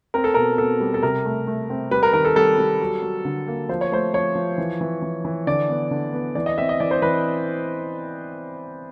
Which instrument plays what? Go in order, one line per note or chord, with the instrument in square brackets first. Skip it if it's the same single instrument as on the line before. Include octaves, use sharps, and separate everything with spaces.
[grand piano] C4 A#4
A4
B2 A#4
B2 A4
G3
A4
C3 A#4
A3
A3
C4
G3 B4
A#4
D#3 A#4
A4
G3 A4
G3
F#3
F#3
D3
A#3
F3 C5
C#5
A3 C5
F3 C#5
F3
E3
E3
E3
E3
D3 D5
B3
D3
B3
E3 D5
D#5
C4 E5
D#5
E3 D5
C5
E3 B4